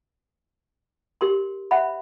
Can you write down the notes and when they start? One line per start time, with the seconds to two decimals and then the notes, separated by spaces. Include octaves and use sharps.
1.21 G4 A#4 C6
1.71 C5 E5 F#5 B5